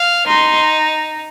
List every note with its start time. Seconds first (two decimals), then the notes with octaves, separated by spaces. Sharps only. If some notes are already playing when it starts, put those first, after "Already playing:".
Already playing: F5
0.27 D#4 C6